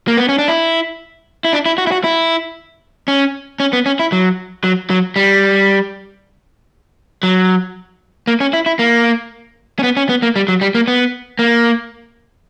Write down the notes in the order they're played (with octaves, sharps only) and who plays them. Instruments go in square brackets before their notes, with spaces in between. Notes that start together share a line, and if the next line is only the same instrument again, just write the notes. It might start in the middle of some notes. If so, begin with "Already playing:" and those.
[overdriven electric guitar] A#3
B3
C#4
D4
E4
E4
D4
E4
F#4
E4
F#4
E4
C#4
C#4
B3
C#4
E4
F#3
F#3
F#3
G3
F#3
A#3
C#4
E4
E4
A#3
C#4
B3
C#4
B3
A#3
G3
F#3
G3
A#3
B3
A#3